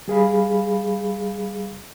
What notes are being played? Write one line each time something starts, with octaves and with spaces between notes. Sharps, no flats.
G3 G#4 F5 B5